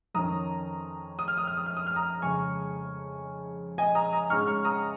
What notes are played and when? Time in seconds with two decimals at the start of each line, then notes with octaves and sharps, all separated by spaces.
0.14 F2 D#3 C#4 A#5 D#6
1.19 D#6
1.28 F6
1.38 D#6
1.47 F6
1.57 D#6
1.66 F6
1.77 D#6
1.87 F6
1.96 A#5 D#6
2.22 F2 C#3 G#3 G#5 C#6
3.78 D#5 G#5
3.95 A#5 D#6
4.13 A#5 D#6
4.30 G#2 G#3 C#4 C#6 F6
4.47 C#6 F6
4.64 A#5 D#6